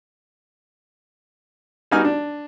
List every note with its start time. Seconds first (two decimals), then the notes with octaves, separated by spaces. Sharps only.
1.91 G3 B3 D#4 F#4 G#5 F6
2.05 D4